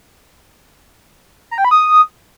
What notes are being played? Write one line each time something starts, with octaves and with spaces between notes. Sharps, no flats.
A#5
G5
B5
D#6